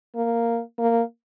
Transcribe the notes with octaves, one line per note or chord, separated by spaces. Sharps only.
A#3
A#3